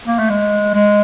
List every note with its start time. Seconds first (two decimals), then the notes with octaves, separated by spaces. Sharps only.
0.08 A#3
0.19 A3
0.30 G#3
0.74 G#3